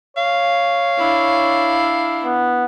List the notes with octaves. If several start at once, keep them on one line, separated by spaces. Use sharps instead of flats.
C#5 F5
D4 E4
B3